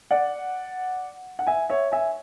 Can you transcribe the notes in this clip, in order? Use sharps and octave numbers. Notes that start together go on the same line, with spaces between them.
D5 F#5
F#5
E5 G#5
C#5 E5
E5 G#5